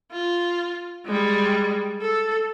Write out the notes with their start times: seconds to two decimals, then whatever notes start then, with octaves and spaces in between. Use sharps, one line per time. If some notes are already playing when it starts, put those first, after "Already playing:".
0.12 F4
1.06 G3 G#3
2.01 A4